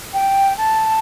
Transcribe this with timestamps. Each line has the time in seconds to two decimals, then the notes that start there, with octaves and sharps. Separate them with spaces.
0.13 G5
0.57 A5